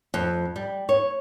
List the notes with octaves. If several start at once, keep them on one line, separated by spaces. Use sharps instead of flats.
F2
G3
C#5